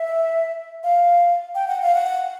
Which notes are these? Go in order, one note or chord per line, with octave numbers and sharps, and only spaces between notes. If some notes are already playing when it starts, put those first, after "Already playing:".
Already playing: E5
F5
G5
F#5
F5
F#5